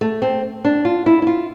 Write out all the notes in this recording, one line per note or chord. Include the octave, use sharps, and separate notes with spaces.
A3
C4
D4
F4
E4
E4
F4